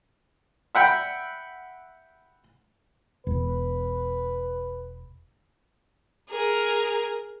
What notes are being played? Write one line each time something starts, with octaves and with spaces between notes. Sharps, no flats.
E5 F#5 G5 B5
E1 B4
G#4 A#4